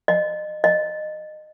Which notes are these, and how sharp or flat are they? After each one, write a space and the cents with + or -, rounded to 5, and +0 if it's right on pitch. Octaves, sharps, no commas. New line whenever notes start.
D#5 -30
D#5 -20